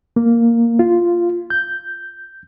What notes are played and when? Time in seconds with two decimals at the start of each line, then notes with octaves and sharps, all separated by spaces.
0.16 A#3
0.79 F4
1.50 G6